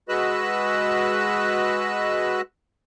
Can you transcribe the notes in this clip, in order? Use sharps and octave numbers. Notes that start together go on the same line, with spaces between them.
G#3 F#4 B4 D#5 E6 F#6